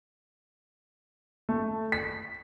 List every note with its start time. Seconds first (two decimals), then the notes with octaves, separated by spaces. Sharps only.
1.49 A3
1.92 B6